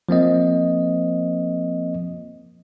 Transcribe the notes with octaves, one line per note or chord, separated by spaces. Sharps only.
F3 A#3 C4 D#5